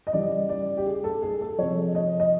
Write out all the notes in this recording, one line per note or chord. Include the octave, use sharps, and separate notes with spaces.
D#5
C#3 E3 G3 D5
D5
G4
G#4
A4
G#4
A4
C3 F3 C#5
D#5
D#5